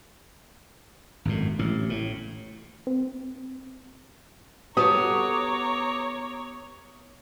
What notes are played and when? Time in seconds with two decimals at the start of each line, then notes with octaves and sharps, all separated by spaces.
1.25 G#1 F#2 A2
1.59 A1 A2
1.90 A2
2.87 C4
4.77 B3 G4 A4 C#5 A#5 D6 D#6